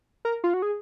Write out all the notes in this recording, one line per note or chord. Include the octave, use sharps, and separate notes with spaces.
A#4
F4
F#4
G#4